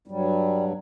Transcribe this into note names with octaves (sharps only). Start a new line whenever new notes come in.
G2 F#3 G3